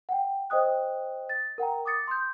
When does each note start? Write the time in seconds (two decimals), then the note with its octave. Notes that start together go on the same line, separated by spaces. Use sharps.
0.09 F#5 G5
0.50 C5 D#5 G5 D#6 F#6
1.29 A6
1.58 A#4 F#5 G5 A#5
1.85 D6 D#6 A6 C#7
2.08 C6 G6